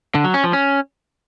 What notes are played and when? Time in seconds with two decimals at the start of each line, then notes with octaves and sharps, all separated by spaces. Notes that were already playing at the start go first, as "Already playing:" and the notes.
0.15 D3
0.24 F#3
0.34 C#4
0.44 F3
0.53 C#4